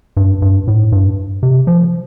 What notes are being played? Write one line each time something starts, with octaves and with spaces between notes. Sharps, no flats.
G2
G2
A2
G2
C3
F3